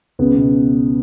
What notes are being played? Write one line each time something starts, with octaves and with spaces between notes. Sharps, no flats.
C#2 B3
B2